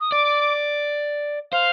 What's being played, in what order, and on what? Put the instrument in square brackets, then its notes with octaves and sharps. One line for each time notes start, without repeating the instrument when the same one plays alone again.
[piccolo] D#6
[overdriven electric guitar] D5 [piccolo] D6
[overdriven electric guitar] C5 [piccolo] F5